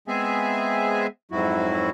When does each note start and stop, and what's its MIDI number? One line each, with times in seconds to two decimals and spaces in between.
0.08 1.07 56
0.08 1.07 59
0.08 1.07 60
0.08 1.07 68
0.08 1.07 76
0.08 1.07 80
1.31 1.90 41
1.31 1.90 44
1.31 1.90 54
1.31 1.90 64
1.31 1.90 66